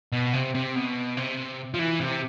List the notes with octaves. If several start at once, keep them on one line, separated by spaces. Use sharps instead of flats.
B2
C3
C3
B2
C3
F3
E3
C3